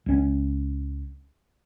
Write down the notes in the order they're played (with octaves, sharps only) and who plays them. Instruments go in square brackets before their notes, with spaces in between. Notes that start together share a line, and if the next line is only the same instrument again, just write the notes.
[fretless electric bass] C#2 C#4